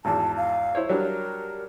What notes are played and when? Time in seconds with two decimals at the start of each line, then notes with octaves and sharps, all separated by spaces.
0.05 G#1 E2 A5
0.36 F5
0.75 E4 C5 C#5
0.89 F#3 G3 D4 A#4